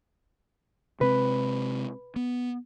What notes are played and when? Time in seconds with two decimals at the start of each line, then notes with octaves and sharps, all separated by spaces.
1.01 C3 G#3 C4 B4
2.16 B3